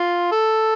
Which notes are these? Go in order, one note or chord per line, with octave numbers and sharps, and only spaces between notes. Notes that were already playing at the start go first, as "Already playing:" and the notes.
Already playing: F4
A4